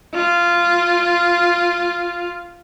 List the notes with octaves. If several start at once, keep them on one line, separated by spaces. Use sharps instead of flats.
F4